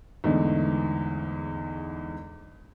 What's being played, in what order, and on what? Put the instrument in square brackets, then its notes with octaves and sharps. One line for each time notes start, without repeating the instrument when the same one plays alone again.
[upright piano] E2 G#2 D3 A3 D4 D#4